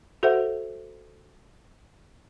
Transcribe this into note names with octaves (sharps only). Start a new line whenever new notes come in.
F#4 A4 C5 E5 F#5